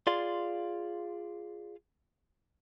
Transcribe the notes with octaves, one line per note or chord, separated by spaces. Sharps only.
F4 G#4 D5 F5 C6